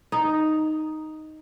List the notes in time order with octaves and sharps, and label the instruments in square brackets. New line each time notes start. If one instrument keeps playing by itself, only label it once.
[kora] D#4